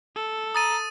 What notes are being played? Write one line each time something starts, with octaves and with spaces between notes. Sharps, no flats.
A4
A#5 D#6 A6 D#7